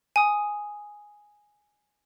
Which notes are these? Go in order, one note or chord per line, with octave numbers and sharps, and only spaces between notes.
G#5 D#6